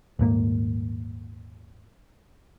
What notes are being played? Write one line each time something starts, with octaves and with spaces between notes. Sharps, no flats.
D#1 G#2 A#3